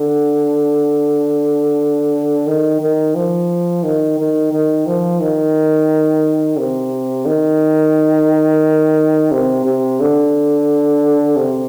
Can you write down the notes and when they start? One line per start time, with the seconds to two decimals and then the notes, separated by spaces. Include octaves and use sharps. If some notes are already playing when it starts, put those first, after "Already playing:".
Already playing: D3
2.47 D#3
2.81 D#3
3.15 F3
3.84 D#3
4.19 D#3
4.52 D#3
4.87 F3
5.21 D#3
6.58 C3
7.26 D#3
9.32 C3
9.65 C3
10.00 D3
11.37 C3